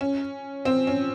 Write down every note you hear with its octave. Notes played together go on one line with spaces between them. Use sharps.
C#4
C4
C#4